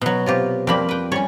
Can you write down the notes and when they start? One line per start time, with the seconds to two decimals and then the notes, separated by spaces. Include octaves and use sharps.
0.01 B2 F#3
0.26 C3 F4 G4
0.67 F2 G3 A#3 G4 B5
0.89 B4 G5
1.12 G3 C#4 C#5